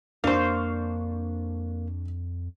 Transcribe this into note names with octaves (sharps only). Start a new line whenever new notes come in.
F2 A#3 D4 C5 F5 C#6